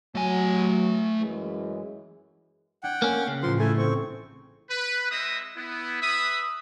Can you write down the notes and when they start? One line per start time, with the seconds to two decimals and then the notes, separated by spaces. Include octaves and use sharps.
0.15 F#3 A3 G#5
1.19 F#2 E3 G#3
2.83 D4 F#5 G5 G#6
3.02 A#3 C#4
3.28 C#3
3.43 A1 A2 F3 A#3 C6
3.60 A3 E4 G#5
3.78 C4 C#6
4.70 B4
5.11 G#3 C4 B4 D#5 E5 D#6
5.56 B3 E4
6.02 B4 E5 B5 D#6